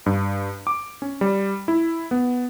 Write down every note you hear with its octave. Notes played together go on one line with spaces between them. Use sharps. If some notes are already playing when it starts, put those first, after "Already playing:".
G2
D6
C#4
G3
E4
B3